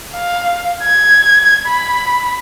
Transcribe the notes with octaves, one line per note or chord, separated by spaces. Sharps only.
F5
G#6
B5